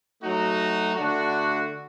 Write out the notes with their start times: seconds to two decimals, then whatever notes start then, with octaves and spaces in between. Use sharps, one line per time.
0.23 F#3 A3 D#4 F#4
0.96 D3 A3 D4 F#4